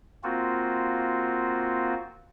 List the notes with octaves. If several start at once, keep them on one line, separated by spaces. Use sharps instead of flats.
A#3 C4 F4 F#4